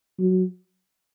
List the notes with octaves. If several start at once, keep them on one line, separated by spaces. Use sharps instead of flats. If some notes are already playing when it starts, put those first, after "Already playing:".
F#3